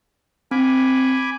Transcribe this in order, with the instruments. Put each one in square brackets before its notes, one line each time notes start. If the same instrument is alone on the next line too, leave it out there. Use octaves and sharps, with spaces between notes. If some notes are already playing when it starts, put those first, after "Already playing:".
[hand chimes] C4 [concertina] G#5 B5 D6